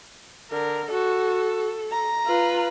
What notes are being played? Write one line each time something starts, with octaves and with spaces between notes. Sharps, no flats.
D3 A#4
F#4 A4
A#5
F4 B4